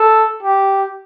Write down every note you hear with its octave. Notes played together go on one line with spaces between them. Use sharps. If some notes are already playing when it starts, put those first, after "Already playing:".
Already playing: A4
G4